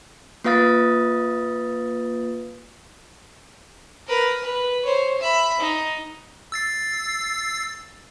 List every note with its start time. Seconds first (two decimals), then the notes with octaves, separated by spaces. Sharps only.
0.44 A#3 F4 B4 F5 D#6 A6
4.07 A#4 B4
4.43 B4
4.85 C5 C#5
5.20 E5 B5
5.60 D#4
6.52 E6 A6 C7